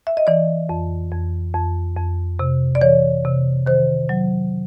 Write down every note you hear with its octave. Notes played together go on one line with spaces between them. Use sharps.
E5
D#5
E3 D5
F2
F2
F2
F2
C3
D5
E3 C#5
C3
D#3 C5
F#3